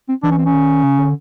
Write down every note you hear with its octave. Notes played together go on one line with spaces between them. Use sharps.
C4
E3 D4
C#4
C4
C#4
D#3
C#3
D3